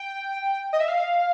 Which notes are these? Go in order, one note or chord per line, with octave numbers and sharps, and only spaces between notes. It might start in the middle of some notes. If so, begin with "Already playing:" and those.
Already playing: G5
D#5
E5
F5